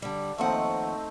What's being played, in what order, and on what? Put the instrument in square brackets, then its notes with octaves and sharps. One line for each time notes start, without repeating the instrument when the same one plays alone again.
[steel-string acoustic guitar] D3 G3
[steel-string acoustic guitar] D#2 F3 F#5 [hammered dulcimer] A3 C4 D#4